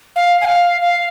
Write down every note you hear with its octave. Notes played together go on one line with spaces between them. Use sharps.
F5
G#5
F5
F5